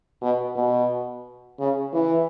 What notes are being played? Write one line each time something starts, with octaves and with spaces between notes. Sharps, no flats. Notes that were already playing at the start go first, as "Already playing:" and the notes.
B2
B2
C#3
E3